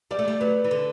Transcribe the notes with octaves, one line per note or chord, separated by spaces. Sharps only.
G3 D5
A3
G3
F#3 B4
E3
D3